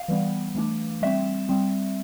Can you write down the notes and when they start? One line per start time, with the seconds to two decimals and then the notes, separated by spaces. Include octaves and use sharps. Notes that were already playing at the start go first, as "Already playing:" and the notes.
Already playing: F5
0.08 E3 G3 B3
0.55 E3 A3 D4
1.02 G3 C4 E5
1.49 G3 C4